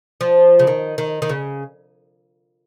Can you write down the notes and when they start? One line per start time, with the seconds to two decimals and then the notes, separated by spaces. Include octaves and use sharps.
0.21 F3
0.59 C#3
0.67 D#3
0.98 D#3
1.22 D#3
1.29 C#3